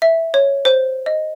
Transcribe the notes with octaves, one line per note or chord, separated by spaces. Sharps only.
E5
C#5
C5
D#5